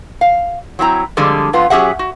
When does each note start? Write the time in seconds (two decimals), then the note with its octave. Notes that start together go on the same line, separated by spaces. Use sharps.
0.21 F5
0.79 F#3 C4 E4 A#5
1.17 F2 D3 G3 G#3
1.53 F2 B3 F4
1.70 F#3 C#4 G4 G#4 E5 F#5
1.99 F#4